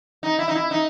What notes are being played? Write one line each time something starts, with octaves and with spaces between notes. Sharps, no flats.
D#4
E4
D#4
E4
D#4